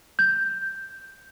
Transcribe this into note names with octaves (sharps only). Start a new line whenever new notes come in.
G6